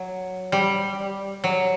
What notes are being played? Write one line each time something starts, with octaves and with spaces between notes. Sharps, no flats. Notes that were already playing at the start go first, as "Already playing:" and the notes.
Already playing: F#3
G3
F#3